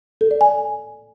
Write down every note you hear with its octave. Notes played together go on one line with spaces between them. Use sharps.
A4
D5
G#5